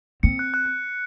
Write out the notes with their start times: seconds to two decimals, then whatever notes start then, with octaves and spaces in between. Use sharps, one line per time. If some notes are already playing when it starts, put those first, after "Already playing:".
0.23 C4 C#7
0.39 F#6
0.54 F#6